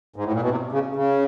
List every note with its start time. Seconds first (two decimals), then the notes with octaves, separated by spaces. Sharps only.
0.16 G#2
0.24 A2
0.32 A#2
0.41 B2
0.49 C3
0.72 C#3
0.96 C#3